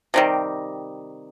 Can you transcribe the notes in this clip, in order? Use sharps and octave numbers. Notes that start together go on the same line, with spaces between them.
C3 D#3 G3